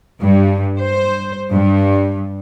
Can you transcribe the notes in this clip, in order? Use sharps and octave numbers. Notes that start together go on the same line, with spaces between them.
G2
C5
G2